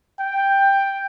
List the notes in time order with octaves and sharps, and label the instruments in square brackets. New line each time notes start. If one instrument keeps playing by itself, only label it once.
[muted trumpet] G5